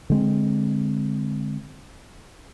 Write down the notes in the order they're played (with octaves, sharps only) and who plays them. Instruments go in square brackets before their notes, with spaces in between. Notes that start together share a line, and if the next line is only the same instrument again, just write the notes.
[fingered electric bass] D3 G#3 C4